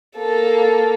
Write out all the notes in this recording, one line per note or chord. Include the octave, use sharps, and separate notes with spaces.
A#3 A4